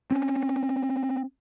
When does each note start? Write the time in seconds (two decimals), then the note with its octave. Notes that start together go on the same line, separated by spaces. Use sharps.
0.11 C4 C#4